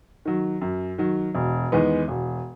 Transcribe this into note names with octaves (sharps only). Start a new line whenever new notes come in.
D#3 F#3
F#2
D#3 F#3
E1
E2 D#3 G#3 B3
E1